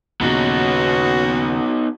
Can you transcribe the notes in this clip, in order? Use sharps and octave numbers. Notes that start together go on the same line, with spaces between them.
D#2 A#2 C#3 B3 D#4 F#4